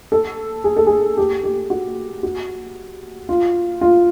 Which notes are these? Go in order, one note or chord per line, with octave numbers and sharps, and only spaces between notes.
A4
G#4
A4
G#4
G4
G4
F#4
F#4
F4
F4